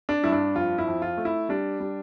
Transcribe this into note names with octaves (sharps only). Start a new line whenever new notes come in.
D4
G2 E4
D4
F2 F4
E4
F2
F4
A3
E4
G3 D4
G3